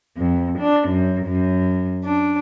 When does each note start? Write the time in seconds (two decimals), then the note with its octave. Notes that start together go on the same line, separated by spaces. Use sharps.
0.18 F2
0.60 D4
0.90 F#2
1.28 F#2
2.05 D4